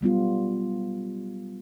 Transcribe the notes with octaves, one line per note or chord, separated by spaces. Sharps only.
F#3 G3 B3 F4